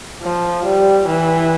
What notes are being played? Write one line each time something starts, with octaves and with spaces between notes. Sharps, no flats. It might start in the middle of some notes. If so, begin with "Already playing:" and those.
F3
G3
E3